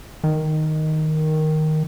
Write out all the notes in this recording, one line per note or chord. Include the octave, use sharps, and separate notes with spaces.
D#3